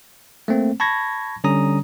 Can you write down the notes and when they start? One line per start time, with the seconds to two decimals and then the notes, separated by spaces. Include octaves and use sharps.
0.48 A3 A#3 C4
0.80 A5 B5 C#6 G#6 A#6
1.44 D3 G3 C#4 A#5 D#6